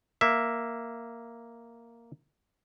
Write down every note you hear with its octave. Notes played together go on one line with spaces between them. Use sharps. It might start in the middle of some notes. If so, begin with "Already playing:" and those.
A#3 E5